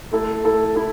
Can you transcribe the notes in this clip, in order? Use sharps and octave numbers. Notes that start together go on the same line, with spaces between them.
A3 E4 A4
A3 E4 A4
E4 A4